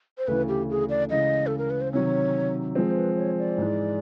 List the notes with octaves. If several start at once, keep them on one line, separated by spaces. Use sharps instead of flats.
C5
D2 C#3 E3 B4
G4
G#4
D5
C#3 E3 G#3 D#5
A4
A#4
B4
C5
C3 D#3 F#3 C#5
F3 G#3 C4 C5
B4
C#5
D5
G#2 E3 G#3